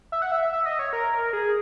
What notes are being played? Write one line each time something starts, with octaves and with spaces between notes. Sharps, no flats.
E5
F#5
E5
E5
E5
D#5
C#5
A#4
A#4
G#4